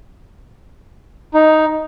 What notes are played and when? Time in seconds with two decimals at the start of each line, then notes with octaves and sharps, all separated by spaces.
1.34 D#4